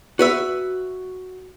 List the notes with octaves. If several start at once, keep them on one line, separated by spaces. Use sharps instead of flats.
F#4 B4 E5